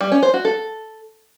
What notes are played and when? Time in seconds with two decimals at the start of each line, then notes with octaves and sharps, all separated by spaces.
0.01 G3
0.12 C#4
0.23 C5
0.34 F#4
0.45 A4